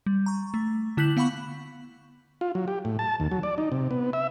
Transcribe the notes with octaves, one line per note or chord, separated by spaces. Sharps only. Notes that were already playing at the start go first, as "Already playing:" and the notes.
G3
A#5 C#6
A3
D3 E4 F#6 G6 B6 F#7
B3 F5 F#5 B5 C#6 F#7
F4
F#3
G4
A2
A5
D#2
F#3
D5
D#4
C3
B3
E5